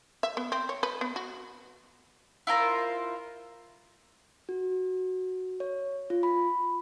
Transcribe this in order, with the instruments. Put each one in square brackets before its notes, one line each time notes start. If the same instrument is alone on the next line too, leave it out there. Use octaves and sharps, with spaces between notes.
[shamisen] E5
B3
C4
C#5
B4
B3
F#4
[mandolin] E4 F4 A#4 C5
[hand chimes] F#4
C#5
F4
B5